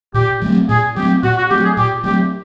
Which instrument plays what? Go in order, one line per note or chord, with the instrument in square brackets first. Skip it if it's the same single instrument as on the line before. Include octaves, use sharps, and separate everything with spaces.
[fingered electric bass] A#2 [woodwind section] G4
[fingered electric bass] F#3 A3 C4
[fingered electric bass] A#2 [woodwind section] G#4
[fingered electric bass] F#3 A3 C4 [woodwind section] G4
[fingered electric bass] A#2 [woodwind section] F#4
[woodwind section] F#4
[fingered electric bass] F#3 A3 C4 [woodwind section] G4
[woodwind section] G#4
[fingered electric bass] A#2 [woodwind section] G4
[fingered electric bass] F#3 A3 C4 [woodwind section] G4